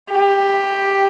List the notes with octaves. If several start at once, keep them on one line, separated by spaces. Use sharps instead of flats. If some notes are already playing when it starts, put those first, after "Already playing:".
G4